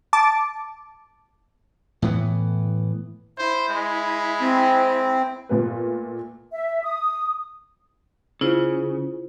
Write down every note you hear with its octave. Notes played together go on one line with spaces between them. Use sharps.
A5 D6
A2 E3 B3
E4 C5
G#3
C4
A#2 A3 B3 B4
E5
D#6
C#3 E4 F4 C5